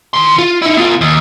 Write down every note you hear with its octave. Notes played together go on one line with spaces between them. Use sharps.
D#3 C6
F4
D#4 E4
B3 F4
D#2